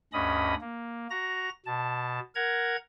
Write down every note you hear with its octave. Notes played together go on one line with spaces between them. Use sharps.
D2 G2 C#4 D#5 B5 D#6
A#3
F#4 A#5 A#6
B2 A5
A#4 F#5 A#5 G#6